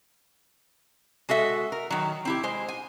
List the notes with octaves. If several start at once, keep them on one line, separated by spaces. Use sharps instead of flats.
G#3 F#4 A4 E5
A#4
D#3 F#3
C4 E4 G4
G#3 C5
G#5